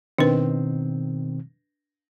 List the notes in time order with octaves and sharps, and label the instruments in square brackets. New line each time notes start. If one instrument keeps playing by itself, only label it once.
[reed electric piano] B2 D#3 C4 [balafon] D4 B4